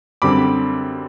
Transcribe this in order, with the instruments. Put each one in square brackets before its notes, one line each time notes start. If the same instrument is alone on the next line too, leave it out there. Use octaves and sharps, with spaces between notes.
[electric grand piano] F#2 D3 G3 C4 B5 D6